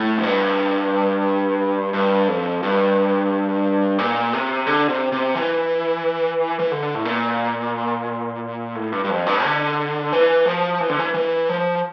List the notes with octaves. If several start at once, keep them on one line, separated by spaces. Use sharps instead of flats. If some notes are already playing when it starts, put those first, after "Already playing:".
Already playing: A2
F2
G2
G2
F2
G2
A#2
C3
D3
C3
C3
E3
E3
D3
A2
A#2
A2
G2
G2
F2
G2
D3
E3
F3
E3
D3
E3
E3
F3